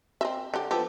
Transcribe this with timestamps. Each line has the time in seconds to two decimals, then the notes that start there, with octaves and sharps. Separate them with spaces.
0.21 C4 D#5 E5
0.54 D3 G4
0.71 F3 B3 G4 A4